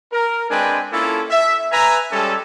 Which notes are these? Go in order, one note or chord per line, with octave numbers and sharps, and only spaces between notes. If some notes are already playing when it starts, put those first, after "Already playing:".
A#4
G#3 C4 D4 B4 G5 G#5
A#3 C#4 E4 F4 A4
E5
B4 E5 G#5 A#5
G3 G#3 C#4 G4 A4